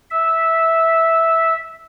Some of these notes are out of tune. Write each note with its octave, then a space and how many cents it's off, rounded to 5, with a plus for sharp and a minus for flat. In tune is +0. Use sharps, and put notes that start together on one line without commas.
E5 -10